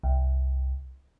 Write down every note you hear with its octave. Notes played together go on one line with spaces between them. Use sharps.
C2